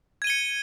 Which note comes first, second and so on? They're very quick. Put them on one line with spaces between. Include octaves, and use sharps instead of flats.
G#6 D#7 G7 C#7